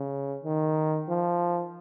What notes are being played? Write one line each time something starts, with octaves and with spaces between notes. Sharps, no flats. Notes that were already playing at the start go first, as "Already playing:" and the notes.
Already playing: C#3
D#3
F3